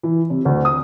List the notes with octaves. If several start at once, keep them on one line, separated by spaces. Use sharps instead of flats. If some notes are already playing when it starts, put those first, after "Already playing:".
E3
C3
D2
D#6